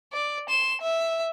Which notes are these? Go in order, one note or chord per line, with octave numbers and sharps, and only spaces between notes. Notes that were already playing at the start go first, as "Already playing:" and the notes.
D5
C6 E7
E5